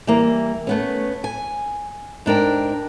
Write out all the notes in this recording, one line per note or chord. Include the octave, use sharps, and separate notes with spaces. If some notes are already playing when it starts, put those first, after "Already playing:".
E3 G3 A#3
A3 B3 C#4
G#5
G#2 D4 A#4 G5